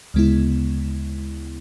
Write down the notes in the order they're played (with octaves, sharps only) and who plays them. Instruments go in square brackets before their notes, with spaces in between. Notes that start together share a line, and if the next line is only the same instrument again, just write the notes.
[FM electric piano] D2 C#3 G#3 B3 E4